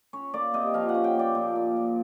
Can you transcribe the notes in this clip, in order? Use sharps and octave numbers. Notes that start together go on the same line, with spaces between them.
C#4 C#5
A#3 D5
C3 D#5
F3 F5
F#5
C#4
G5
A#3 D5
A#2
A#3
A#2